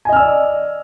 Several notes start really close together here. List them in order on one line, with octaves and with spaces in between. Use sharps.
G#5 D#5 F6 E6 D5